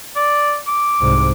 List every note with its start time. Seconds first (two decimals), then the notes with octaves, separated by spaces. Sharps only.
0.16 D5
0.67 D6
1.00 C2 G#2